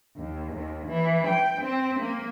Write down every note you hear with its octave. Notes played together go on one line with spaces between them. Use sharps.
D#2
D#2
E3
G5
C4
A#3